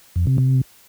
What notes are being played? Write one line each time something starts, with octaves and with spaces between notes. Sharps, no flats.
F2
C3
C3